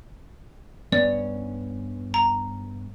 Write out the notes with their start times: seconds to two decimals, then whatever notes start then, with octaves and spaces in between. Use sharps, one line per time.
0.92 G2 B3 C#4 D5
2.14 A#5